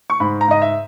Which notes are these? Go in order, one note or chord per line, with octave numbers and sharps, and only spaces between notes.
C#6
G#2 B5
A#5
G#2 D#5
E5